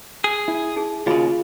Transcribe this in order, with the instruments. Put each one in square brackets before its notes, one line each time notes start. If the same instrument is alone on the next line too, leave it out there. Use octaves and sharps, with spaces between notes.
[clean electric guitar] G#4
[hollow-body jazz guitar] E4
[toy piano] D#4 G#4
[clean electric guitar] D#2 C#3 [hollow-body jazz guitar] F4 [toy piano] F#4 G#4 B5